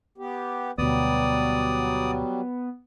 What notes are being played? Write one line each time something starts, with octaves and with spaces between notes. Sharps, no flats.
B3 G4
D2 B2 F#3 G3 B3 D5 D#6